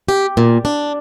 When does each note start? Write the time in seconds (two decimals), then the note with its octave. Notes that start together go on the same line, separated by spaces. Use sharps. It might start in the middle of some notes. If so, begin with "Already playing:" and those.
0.08 G4
0.37 A#2
0.65 D4